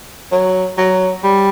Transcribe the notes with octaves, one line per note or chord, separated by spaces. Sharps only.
F#3
F#3
G3